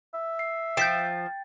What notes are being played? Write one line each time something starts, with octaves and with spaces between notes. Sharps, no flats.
E5
C7
F3 G5 G6 A6 B6 D7